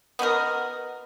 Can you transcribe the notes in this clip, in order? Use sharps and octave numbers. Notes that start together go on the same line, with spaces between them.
B3 D#4 F#4 A#4